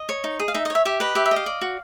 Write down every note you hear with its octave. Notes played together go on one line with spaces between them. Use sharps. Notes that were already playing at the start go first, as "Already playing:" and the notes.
Already playing: D#5
C#5
D#4
G#4
F5
D#4 E5
D#5
C#5 E5
G4 E5
B4 D#5
G4 E5
E5
D#5
F5
D5
F#4